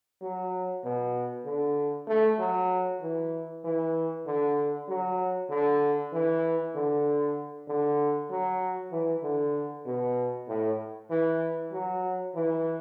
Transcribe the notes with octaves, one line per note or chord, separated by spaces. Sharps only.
F#3
B2
D3
A3
F#3
E3
E3
D3
F#3
D3
E3
D3
D3
F#3
E3
D3
B2
A2
E3
F#3
E3